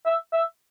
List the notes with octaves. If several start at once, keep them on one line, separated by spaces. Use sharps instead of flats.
E5
E5